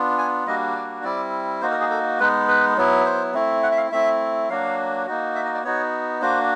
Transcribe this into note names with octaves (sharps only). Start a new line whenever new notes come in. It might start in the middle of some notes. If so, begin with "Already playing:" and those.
Already playing: B3 D4 F4
G#5
G3 A#3 D4 F#4 D#5
D5
G3 C4 E4 D5
A#3 D#4 F#4 C5
A#4
G#4
A4
G#3 B3 D#4 B4
B4
F#3 B3 E4
C5
A3 C4 E4
F#5
E5
F5
A3 C4 E4 E5
F#3 A#3 D4 F#4 F5
A#3 D#4 F#4
E5
D#5
D5
B3 D#4 F#4 C#5
A#3 D4 F#4 C5